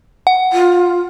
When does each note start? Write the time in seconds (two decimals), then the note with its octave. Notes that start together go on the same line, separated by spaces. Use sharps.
0.27 F#5
0.53 F4